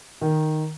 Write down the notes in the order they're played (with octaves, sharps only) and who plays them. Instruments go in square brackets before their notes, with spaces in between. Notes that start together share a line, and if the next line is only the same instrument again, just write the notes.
[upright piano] D#3